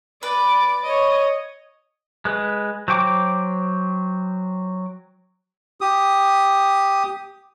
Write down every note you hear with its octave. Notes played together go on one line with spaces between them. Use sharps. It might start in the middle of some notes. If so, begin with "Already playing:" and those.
B4 D5 D6
C#5 D#5
G#3 B4
F#3 C5 G5 D6
G4 D#6